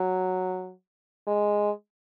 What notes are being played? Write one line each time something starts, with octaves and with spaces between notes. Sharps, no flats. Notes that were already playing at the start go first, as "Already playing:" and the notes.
Already playing: F#3
G#3